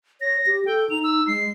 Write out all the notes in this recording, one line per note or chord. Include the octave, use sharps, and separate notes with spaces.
C#5 A#6
G4
A4 G5
D#4 F7
E6
G#3 C7